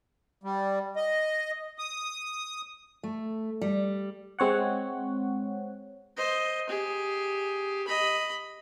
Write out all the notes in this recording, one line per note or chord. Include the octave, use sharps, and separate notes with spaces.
G3
D#5
D#6
A3
G3
G#3 C4 C#5 F#5
C5 D#5
G4 G#4
D#5 B5